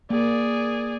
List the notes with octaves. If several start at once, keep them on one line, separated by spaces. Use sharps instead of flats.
A#3 G#4 D5